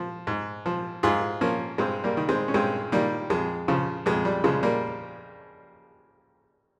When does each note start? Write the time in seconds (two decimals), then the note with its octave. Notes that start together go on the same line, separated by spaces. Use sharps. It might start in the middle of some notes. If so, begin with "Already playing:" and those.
Already playing: F3
0.27 G#2
0.66 F3
1.03 G#2 F4 G#4
1.41 F3 A#3 C#4
1.78 G2 G#3 C4
2.04 G3 A#3
2.17 D#3
2.29 G#3 C4
2.48 C#4
2.54 G2 G#3 C4
2.92 D#3 G3 A#3
3.30 F2 G#3
3.68 C#3 F3
4.06 F2 G#3
4.25 G3
4.44 C#3 F3 G#3
4.63 G3 A#3